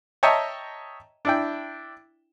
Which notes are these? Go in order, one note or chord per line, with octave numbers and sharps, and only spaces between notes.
C#5 D#5 E5 G5 A5 A#5
D4 E4 G5